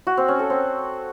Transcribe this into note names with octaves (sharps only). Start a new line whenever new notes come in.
F#4
C4
C#4
A4
C4